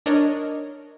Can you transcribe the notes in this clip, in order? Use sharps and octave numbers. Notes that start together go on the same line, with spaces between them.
D4 A#4 C#5 D#5